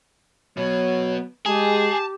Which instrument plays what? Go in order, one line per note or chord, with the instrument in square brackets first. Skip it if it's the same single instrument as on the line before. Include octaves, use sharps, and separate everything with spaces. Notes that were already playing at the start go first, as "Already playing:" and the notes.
[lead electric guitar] B2 B3 [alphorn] F#3 [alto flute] C#5
[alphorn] G#3 [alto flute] G4 [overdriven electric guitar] G#4 [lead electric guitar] A5